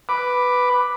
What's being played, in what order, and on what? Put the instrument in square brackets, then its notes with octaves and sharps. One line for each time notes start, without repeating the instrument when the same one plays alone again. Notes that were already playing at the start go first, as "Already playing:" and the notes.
[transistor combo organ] B4 D6